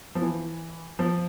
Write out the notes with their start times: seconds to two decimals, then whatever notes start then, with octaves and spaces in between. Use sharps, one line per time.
0.15 F3
0.22 E3
0.99 F3